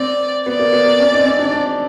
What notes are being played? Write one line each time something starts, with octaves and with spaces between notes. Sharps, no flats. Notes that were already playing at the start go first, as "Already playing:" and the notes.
Already playing: C4 D5
B3 D5
A#3
B3
B3
C#4
D#4
C4
C#4
D4
D4